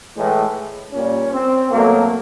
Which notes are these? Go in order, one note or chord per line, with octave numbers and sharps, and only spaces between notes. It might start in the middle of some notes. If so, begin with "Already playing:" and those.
A2 E3 G#3
A#2 G3 C#4
C4
B2 F#3 A3 A#3